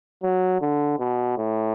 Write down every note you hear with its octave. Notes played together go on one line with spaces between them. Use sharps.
F#3
D3
B2
A2